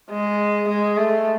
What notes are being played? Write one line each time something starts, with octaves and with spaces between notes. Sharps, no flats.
G#3
G#3
A3